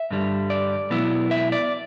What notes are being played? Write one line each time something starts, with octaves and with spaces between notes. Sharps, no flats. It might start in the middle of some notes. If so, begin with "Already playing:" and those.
Already playing: E5
G2 D3 G3
D5
B2 F#3 B3 E4
E5
D5